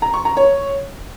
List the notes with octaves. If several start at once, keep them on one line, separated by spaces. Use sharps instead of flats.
A#5
C#6
A#5
C#5